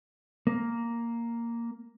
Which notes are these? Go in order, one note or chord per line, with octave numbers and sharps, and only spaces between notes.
A#3